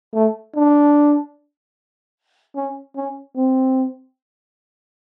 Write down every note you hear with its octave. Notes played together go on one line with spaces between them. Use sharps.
A3
D4
C#4
C#4
C4